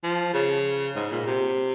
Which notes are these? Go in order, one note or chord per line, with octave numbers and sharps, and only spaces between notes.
F3
C#3
G#2
A#2
C3